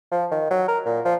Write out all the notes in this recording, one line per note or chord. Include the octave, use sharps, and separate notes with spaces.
F3
D#3
F#3
A#4
A#2
F3